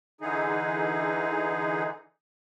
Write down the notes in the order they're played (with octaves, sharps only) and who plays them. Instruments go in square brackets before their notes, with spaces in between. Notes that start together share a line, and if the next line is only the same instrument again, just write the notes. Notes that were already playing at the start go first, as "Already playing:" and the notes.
[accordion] D3 E3 D#4 G#4